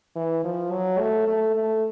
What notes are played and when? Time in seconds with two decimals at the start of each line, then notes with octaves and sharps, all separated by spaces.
0.16 E3
0.44 F3
0.71 F#3
1.00 A3
1.28 A3
1.55 A3